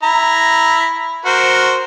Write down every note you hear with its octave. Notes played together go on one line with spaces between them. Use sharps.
E4 A#5
F#4 A#4 C5